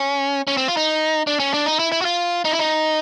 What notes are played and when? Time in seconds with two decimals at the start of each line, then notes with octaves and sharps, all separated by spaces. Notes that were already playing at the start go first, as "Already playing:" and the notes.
Already playing: C#4
0.47 C#4
0.57 C4
0.68 F4
0.77 D#4
1.27 D4
1.40 C#4
1.54 D4
1.66 D#4
1.79 E4
1.92 E4
2.01 F#4
2.05 F4
2.45 D#4
2.52 E4
2.59 D#4